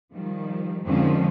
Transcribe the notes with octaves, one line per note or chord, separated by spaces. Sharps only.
D#3 F3 G3
F2 D3 D#3 F3 G#3 C#4